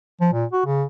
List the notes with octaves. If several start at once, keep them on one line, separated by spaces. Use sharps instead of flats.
F3
A#2
F#4
C#3